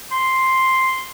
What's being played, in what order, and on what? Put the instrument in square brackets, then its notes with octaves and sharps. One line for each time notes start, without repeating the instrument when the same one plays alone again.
[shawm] C6